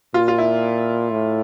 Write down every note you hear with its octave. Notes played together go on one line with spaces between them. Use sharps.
A#2 F4
F4
E4
A2